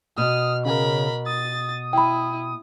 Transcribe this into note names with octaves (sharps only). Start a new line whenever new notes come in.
B2 D#6 F6
C#3 A#4 B5
D#6 A6
E4 G5 B5